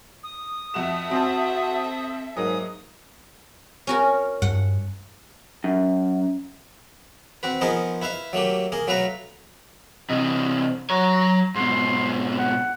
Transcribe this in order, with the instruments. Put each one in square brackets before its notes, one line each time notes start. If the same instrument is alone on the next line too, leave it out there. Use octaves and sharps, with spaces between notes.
[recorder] D#6
[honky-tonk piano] F2 F#4 E7 [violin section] A4 E5
[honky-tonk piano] C4 C5 A5 [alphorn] F#4
[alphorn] G#2 [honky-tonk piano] F#3 A#3 [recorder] D#6
[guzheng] C#4 F#4 A#4
[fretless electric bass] G2 [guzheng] F#5
[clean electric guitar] F#2
[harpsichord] C4 F#4 B4
F3 B3 D#4 G#4 A#4 C5
E4 B4 E5 F5
F#3 A3 A#3 G4
A#3 G#4 A#4
F#3 A3 B4 F5 A#5
[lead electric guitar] C3 E3 [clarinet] D#5
[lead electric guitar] F#3 C#5 [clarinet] A#5
[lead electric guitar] G#2 B2 [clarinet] C6
[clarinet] F#5